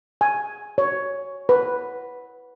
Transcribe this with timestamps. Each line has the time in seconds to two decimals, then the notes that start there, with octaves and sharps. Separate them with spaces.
0.21 G#5
0.78 C#5
1.49 B4